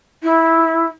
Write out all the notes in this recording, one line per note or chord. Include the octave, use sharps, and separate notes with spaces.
E4